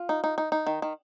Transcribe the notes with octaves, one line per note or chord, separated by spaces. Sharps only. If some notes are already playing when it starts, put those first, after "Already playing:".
Already playing: F4
D#4
D#4
D#4
D#4
D#3
D#3